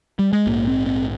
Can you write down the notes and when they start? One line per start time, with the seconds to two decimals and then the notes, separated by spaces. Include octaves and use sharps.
0.19 G3
0.33 G#3
0.46 A#1 G#2 A#3
0.67 C4
0.86 C4